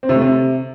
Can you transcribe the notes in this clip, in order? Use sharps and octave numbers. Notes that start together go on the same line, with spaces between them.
C4
C3
A3
C3